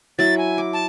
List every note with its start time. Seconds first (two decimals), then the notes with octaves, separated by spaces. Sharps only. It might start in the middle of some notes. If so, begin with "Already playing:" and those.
0.19 F#3 E4 A6
0.38 G#5
0.58 D6
0.73 A5